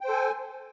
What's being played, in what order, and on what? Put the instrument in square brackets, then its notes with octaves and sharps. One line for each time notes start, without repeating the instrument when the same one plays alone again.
[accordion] G5
C5
A4
G#5